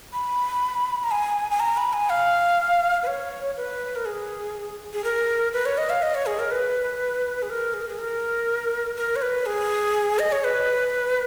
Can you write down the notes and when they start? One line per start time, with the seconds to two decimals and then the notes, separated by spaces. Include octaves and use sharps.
0.13 B5
1.03 A#5
1.11 G#5
1.51 G#5
1.60 A#5
1.77 B5
1.93 G#5
2.10 F5
3.03 B4
3.07 C#5
3.57 B4
3.96 A#4
4.05 G#4
4.93 G#4
5.04 A#4
5.53 B4
5.66 C#5
5.78 D#5
5.90 F5
6.02 D#5
6.15 C#5
6.26 G#4
6.39 A#4
6.51 B4
7.42 G#4
7.50 A#4
7.74 G#4
7.82 A#4
7.89 G#4
7.99 A#4
8.97 A#4
9.16 C#5
9.22 B4
9.46 G#4
10.19 D#5
10.32 C#5
10.44 B4